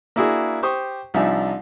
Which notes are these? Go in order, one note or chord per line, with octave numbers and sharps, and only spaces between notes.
A#3 D4 E4 F#4 G#4
G4 C5 C#6 D#6
C2 F3 D4 D#4 E5 G#5